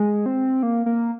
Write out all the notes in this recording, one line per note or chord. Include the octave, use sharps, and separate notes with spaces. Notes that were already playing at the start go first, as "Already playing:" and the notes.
Already playing: G#3
C4
A#3
A#3